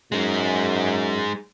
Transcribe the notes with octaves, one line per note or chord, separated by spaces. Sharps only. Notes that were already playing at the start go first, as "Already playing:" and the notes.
F#2 G#3 D#4